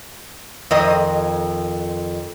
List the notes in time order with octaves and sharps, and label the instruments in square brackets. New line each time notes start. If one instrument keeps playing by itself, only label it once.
[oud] F2 D#3 D#5